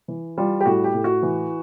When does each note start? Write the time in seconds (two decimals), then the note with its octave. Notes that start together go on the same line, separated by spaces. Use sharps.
0.08 E3
0.37 G3 F4
0.60 G4
0.66 A2 F#4
0.84 G4
0.94 A2
1.04 F#4
1.23 E3